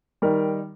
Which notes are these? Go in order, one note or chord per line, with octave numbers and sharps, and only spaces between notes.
D#3 G3 A#4